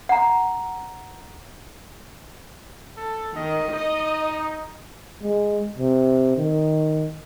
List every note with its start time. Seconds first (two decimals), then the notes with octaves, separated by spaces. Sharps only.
0.09 F#5 A#5
2.97 A4
3.36 D#3 D#5
3.73 D#4 D#5
5.22 G#3
5.78 C3
6.37 D#3